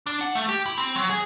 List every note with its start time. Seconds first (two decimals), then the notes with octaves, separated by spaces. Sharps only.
0.07 D4
0.21 F#5
0.35 A3
0.49 G4
0.66 E4
0.78 C4
0.96 F#3
1.10 G#4